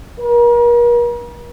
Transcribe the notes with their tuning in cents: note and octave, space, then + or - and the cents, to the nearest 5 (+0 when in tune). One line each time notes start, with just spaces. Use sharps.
A#4 +40